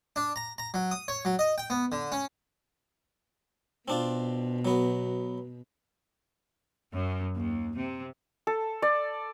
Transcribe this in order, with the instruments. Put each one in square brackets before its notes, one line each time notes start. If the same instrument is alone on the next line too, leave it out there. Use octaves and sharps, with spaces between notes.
[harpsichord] D4
A#5
A#5
F#3
D#6
C#5
F#3
D#5
G5
B3
D3
C#4
[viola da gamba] B2 [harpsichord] C4 D4 F4
[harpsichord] F#3 B3
[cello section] F#2
D#2
C3
[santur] A4
D5